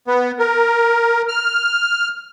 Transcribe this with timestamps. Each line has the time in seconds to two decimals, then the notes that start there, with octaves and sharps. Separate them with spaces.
0.07 B3
0.39 A#4
1.29 F6